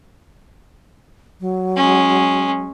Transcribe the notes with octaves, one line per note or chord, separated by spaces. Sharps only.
F#3
G#3 C#4